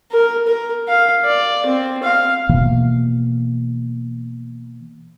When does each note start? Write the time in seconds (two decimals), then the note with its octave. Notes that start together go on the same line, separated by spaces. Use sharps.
0.12 A#4
0.47 A#4
0.88 F5
1.25 D5
1.66 C4
2.03 F5
2.49 B2 E3 A#3